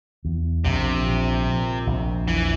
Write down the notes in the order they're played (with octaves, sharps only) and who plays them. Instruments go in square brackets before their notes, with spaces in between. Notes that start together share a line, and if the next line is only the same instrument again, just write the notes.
[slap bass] E2
[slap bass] A#1 [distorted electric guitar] C3
[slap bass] A#2
A#2
A#1
[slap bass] E2 [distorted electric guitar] E3